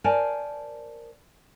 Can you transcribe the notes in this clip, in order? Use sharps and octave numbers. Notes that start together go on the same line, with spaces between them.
A#4 C5 D5 G#5 A5